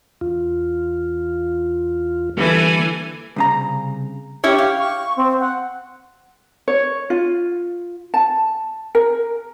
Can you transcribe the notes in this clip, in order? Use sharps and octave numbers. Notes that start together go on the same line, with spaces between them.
E2 F4
D3 E3 G3 A#3 A4 G#5
C2 C#3 A#5
C#4 E4 G4 C#5
F5
C#6
C4
F#5
C#5
F4
A5
A#4